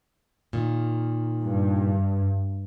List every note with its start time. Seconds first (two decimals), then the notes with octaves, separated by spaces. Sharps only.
0.53 A#2 D#3
1.43 G2